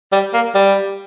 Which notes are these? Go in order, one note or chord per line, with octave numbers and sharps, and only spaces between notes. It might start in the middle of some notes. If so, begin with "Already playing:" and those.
G3
A#3
G3